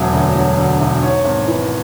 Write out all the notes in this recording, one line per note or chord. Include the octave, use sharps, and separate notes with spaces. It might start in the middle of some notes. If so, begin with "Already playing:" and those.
Already playing: E1 D2 D3 F#3 E5
D2
F#3
D3
E1
G#2 C#5
G#1
E3